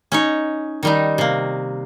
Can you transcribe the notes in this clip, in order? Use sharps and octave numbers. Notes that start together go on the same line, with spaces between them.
C#4 D#4 C#5
D#3 G3 D#4
C3 A#3